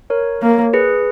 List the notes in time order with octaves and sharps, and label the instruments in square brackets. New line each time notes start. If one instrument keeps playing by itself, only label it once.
[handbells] A#4 C#5
[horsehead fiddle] A#3
[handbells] G#4 B4